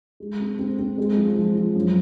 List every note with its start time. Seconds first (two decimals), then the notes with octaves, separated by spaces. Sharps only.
0.20 G#3
0.40 C4
0.59 C4
0.79 C4
0.98 G#3
1.17 F3
1.37 F3
1.56 F3
1.75 F#2